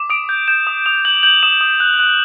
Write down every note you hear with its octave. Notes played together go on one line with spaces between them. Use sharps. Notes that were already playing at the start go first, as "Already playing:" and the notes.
Already playing: D6
D#6 D7
G6
G6 E7
D#6
D#6 F7
G6 F#7
G6 F#7
D#6 E7
D#6
F#6
F#6